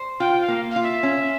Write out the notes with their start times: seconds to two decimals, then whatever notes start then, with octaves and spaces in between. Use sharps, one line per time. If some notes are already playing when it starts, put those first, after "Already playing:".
Already playing: C5
0.20 F4 G5
0.41 F5
0.48 A#3
0.71 F5
0.76 F4
0.83 E5
1.03 C#4